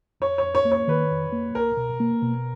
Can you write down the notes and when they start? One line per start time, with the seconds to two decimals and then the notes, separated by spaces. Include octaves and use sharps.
0.20 F2 C#5
0.38 C#5
0.44 F2
0.55 C#5
0.65 A#3
0.72 C#5
0.88 D#3 B4
1.11 F2
1.32 A#3
1.55 C#2 A#4
1.77 B2
2.00 A#3
2.22 B2